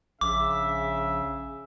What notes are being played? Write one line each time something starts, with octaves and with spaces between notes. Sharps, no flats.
A#1 C#3 E5 D6